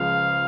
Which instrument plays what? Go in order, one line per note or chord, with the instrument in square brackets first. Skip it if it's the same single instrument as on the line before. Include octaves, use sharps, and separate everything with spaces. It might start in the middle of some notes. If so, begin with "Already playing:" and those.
Already playing: [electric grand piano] C#2 C#3 F3 [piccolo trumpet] F5